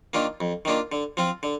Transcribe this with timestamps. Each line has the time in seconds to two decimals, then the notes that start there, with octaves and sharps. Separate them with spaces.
0.13 D#3 A#3 D4 F4
0.41 F2
0.65 D#3 A#3 D4 F4
0.92 D3
1.17 F3 C4 F4
1.43 D3